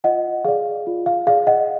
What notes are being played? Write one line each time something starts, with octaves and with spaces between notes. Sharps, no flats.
F4 D#5 F#5
G#4 D5 F5
F4
F5
G#4 D5 F5
D#5 F#5